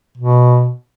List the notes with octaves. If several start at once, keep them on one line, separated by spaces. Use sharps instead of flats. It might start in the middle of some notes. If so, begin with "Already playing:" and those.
B2